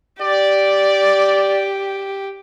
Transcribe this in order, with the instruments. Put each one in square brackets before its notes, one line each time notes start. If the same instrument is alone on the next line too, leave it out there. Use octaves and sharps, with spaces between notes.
[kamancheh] G4 [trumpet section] D5